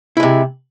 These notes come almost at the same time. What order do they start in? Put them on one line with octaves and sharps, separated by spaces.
E4 G#3 C3